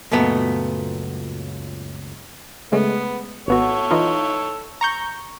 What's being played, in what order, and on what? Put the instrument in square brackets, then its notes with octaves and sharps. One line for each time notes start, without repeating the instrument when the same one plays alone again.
[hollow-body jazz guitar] C#2 F#2 A#2 A3 B3
[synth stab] C#3 G#3 A3 [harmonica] B3
[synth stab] G#1 B3 F#4 [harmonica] A4 C#5
[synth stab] E3 D#4 F4
A#5 C#6 G6